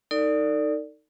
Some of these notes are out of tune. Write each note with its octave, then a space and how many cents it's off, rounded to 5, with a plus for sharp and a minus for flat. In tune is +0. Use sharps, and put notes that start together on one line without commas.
D#4 +0 A4 +40 D5 +0